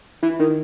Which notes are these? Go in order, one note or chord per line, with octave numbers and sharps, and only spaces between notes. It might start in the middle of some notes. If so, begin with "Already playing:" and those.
E3
D#3